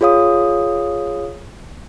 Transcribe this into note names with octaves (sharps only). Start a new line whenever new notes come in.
F4 G#4 C#5 F5 D#6